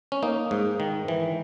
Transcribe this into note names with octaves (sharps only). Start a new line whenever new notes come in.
C#4
A#3 D#4
G#2
D#3
E3